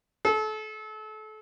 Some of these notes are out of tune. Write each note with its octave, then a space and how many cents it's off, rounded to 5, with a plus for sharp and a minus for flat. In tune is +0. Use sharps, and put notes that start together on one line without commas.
A4 -30